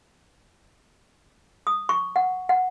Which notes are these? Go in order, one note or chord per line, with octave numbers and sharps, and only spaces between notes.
D#6
C#6
F#5
F#5